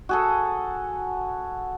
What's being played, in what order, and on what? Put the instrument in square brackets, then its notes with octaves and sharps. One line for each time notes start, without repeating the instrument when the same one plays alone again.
[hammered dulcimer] F#4 G#4 A4